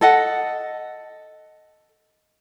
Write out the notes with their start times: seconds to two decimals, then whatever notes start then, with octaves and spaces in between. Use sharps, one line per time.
0.01 A4 D#5 F#5